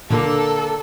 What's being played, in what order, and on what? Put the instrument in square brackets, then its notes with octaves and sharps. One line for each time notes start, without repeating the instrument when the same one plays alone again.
[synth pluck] A#2 [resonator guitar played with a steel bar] D3 A#3 [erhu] A4